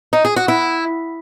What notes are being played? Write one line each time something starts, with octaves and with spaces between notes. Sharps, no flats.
D#4
G#4
F#4
E4